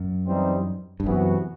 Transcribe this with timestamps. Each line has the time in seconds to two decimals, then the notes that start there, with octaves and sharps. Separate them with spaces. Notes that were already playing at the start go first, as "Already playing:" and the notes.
Already playing: F#2
0.26 E3 G3 C4 D#4
1.00 G2
1.06 F#2 C3 E3 B3 F#4